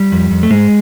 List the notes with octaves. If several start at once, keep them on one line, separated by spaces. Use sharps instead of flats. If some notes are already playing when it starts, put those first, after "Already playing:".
Already playing: G3
F2
F2
A3
G#2 G#3